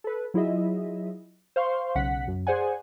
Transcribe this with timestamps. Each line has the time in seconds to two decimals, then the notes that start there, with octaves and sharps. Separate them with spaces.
0.04 A4 B4
0.34 F#3 E4 F4 G#4 D#5 E5
1.56 C5 F5 C6 C#6
1.95 B1 C#3 F#5 B6
2.28 F#2
2.47 G#4 C5 D5 F#5 G#5